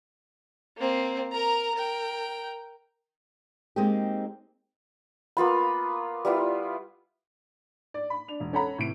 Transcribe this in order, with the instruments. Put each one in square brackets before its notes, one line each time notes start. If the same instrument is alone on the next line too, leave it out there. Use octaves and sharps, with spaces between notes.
[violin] A#3 C4
A#4 A#5
A#4 G5
[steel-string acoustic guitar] G#3 A#3 C4 D#4 G4
[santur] A#3 B3 F4 B5
G3 B3 E4 F4
[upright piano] D5
B5
D4 F7
E1
C#4 A4 C#5 F#5 A#5 B5
A2 C3 E3 D7